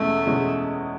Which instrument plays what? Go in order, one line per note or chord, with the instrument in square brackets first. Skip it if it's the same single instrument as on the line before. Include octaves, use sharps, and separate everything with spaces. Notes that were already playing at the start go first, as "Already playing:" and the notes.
Already playing: [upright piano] E2 B2 G#3 C#4 [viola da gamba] A3
[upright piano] E2 B2 G#3 C#4